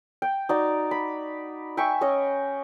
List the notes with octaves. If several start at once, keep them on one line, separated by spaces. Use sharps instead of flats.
G5
D#4 F#4 D5
B5
E5 G5 G#5 C#6
C#4 C#5 D#5